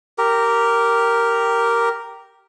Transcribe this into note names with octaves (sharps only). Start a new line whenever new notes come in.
G4 A#4